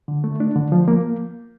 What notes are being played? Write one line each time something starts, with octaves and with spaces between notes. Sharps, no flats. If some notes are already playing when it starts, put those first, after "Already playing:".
D3
A3
D4
D3
F3
A#3